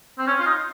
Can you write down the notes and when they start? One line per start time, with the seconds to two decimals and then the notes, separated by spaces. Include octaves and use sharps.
0.18 C4
0.27 C#4
0.40 F4
0.46 D#4